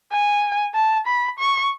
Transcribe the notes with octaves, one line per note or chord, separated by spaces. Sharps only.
G#5
A5
B5
C#6